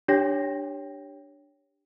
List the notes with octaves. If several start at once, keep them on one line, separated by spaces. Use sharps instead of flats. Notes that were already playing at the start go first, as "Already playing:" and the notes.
D4 G4 C#5 G5 A#6